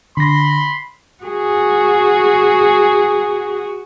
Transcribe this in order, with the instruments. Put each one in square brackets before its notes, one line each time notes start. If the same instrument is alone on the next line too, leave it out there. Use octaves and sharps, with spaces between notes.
[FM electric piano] D3 A#6 [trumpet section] B5 C6
[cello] F#4 G#4